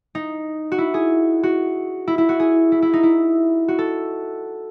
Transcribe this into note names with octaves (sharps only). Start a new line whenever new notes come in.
D#4
F#4
E4
G#4
F#4
E4
E4
F#4
G#4
E4
E4
D#4
E4
F#4
A4